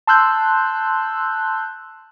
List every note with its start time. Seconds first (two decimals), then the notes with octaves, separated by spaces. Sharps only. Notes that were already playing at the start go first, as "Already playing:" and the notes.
0.07 A5 C6 E6 F#6 G6